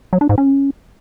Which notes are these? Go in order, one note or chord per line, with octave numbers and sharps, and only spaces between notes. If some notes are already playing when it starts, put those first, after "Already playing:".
F#3
D4
G#2
C#4